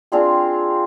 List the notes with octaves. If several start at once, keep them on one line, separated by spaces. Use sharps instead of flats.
C4 D4 F4 G#4